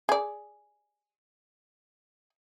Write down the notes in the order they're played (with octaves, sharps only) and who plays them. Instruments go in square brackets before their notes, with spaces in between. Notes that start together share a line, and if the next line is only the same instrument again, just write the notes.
[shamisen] G#4 D5